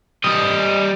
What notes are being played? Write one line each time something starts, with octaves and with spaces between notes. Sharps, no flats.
G3 D#5